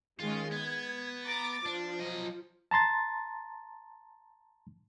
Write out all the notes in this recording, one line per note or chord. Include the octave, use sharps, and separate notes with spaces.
D#3 G#3 C#4 F4
B3 G#6
A#5 D6 A6
F3 D4
F#3 D#5
A5 A#5 C6 A6